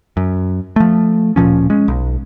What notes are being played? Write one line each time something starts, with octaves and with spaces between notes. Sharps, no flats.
F#2
F3 A3
D1 A#2 F3 C#4
G#3 C#4
B1